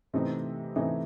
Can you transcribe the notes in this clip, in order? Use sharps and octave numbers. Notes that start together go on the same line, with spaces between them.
C3 E3 A3 C4 D#4
C3 E3 A3 C4 D#4